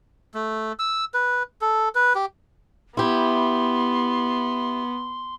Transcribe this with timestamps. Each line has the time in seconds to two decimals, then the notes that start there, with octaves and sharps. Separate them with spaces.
0.34 A3
0.79 E6
1.14 B4
1.61 A4
1.95 B4
2.15 G4
2.97 B3 E4 G4 C6